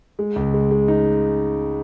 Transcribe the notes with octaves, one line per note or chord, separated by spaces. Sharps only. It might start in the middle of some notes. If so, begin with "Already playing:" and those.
G#3
C#2
G#3
G#3
D#4